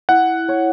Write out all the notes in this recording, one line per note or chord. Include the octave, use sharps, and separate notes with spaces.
E4 F#5
C#5